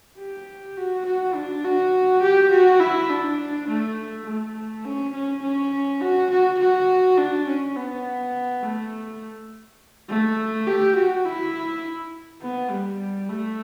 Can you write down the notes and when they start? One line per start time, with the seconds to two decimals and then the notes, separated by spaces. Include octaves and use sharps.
0.18 G4
0.77 F#4
1.05 F#4
1.34 D4
1.64 F#4
2.22 G4
2.51 F#4
2.80 E4
3.09 D4
3.68 A3
4.26 A3
4.84 C#4
5.13 C#4
5.42 C#4
6.01 F#4
6.30 F#4
6.59 F#4
7.17 D4
7.47 C#4
7.75 B3
8.62 A3
10.08 A3
10.66 G4
10.96 F#4
11.25 E4
12.41 B3
12.70 G3
13.29 A3